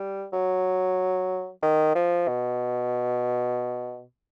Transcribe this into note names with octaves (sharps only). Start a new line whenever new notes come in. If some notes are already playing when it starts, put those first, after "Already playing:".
Already playing: G3
F#3
D#3
F3
B2